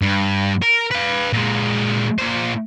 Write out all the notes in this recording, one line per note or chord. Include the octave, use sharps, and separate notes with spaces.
G2
A#4
B4 F5
A#2 G#3
A#2 C5